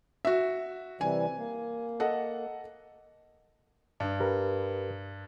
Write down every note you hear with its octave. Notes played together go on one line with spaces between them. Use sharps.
F#4 E5
C3 E3 G3 G#5
A#3
A4 D#5 F#5
G2
G4 A#4 B4